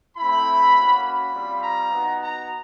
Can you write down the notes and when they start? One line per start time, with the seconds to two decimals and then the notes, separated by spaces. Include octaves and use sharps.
0.17 A3 C4 E4 B5
0.75 A#3 C#4 F#4
1.04 B5
1.33 G3 C4 F4
1.61 A#5
1.91 B3 D#4 F#4
2.20 A#5